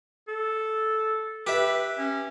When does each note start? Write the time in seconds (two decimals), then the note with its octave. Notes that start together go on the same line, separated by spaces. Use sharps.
0.28 A4
1.47 G4 B4 E5
1.98 C#4